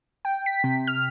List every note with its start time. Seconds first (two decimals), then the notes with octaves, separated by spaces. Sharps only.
0.25 G5
0.46 B6
0.64 C3
0.87 F6